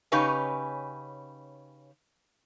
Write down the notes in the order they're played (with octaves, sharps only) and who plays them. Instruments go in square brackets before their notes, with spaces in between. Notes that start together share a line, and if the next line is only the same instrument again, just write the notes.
[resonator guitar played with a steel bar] C#3 C#4 D#4 G4 B4 G#5